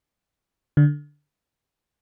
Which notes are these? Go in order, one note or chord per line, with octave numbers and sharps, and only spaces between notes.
D3